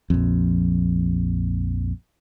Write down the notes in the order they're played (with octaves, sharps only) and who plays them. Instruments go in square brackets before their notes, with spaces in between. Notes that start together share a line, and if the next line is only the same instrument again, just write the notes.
[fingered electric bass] A#1 F2